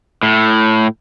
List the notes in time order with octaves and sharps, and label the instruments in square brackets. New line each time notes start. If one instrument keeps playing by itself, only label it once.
[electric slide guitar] A2